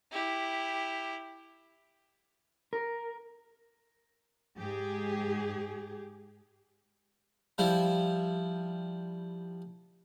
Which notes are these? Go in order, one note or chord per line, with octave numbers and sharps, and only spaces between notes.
E4 G4
A#4
G#2 G4 G#4
F3 G3 E4